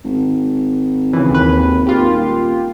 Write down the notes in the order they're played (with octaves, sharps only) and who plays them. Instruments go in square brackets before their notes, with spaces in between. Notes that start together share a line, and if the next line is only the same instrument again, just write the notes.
[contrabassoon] G#1
[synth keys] C#3 E3
D#2 B4
A#3 F4 G4
[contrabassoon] D#1